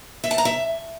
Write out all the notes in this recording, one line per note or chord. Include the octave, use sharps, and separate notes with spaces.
E5
A5
A#5
E5